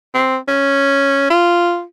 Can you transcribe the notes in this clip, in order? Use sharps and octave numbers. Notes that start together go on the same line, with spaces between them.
C4
C#4
F4